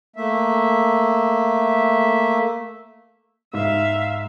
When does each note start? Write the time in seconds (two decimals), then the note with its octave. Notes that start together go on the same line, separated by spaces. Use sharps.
0.16 A3 A#3 E5
3.54 G#2 E5 F5